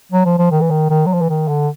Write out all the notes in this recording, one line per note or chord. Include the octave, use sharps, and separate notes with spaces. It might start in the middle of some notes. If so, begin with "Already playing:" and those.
F#3
F3
F3
D#3
E3
D#3
D#3
F#3
F3
E3
D#3
D3